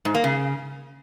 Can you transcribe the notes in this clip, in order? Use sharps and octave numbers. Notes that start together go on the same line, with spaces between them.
G#2
A#3
C#3